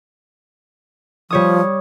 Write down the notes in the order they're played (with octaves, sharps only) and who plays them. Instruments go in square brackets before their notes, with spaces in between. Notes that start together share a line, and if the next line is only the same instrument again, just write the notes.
[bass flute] F3 [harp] G3 C#5 D#6